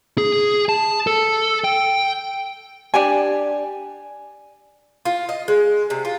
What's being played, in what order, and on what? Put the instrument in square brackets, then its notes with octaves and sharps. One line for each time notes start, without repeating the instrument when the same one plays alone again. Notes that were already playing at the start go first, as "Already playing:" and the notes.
[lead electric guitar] G#4
A5
A4
G5
[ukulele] D4 G4 D5 G#5
[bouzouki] F4
D#5
G#3
C3
F4